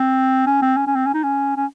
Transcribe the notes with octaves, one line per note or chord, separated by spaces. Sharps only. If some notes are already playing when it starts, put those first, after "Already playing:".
Already playing: C4
C#4
C4
C#4
C#4
C4
C#4
D#4
C#4
C#4